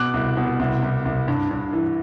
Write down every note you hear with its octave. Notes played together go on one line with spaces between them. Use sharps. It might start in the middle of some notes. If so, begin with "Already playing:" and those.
Already playing: B2 D6 F#6
C2
B2
C2
C2
C2
G2
G2
E3